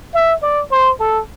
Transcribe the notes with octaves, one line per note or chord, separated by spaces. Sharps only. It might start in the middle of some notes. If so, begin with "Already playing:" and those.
E5
D5
C5
A4